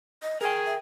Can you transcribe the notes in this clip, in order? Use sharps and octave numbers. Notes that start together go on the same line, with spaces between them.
D#5
G#4 A#4 G5 G#5
E5